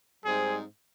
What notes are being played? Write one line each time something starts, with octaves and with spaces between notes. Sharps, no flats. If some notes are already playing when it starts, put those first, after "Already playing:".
G#2 G3 C4 D#4 G#4